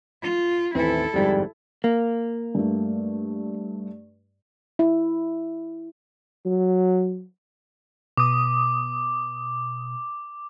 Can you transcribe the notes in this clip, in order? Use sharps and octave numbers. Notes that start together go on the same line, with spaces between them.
F4
A1 D#2 E3 C4 E4 A4
G1 F2 G#2 G3
A#3
G2 A3
E4
F#3
B2 D6 D#6